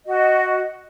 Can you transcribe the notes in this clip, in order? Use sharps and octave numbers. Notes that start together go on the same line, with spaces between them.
F#4 D#5